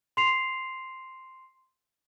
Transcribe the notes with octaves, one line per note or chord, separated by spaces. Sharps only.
C6 C7 F7